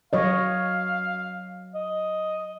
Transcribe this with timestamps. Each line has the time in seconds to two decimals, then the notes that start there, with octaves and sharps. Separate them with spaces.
0.13 F#3 C#5 D#5 F5
1.74 D#5